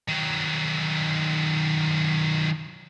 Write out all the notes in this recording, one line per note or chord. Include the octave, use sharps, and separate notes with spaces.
D#3 F#3